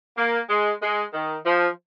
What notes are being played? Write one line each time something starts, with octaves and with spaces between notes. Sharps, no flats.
A#3
G#3
G#3
D#3
F3